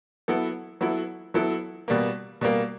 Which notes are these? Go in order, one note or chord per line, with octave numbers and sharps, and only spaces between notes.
F#3 B3 E4 A4
F#3 B3 E4 A4
F#3 B3 E4 A4
B2 G3 A#3
B2 G3 A#3